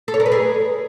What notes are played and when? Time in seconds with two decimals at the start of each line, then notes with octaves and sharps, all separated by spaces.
0.08 A4
0.14 C#5
0.20 A#4
0.26 B4
0.32 G#4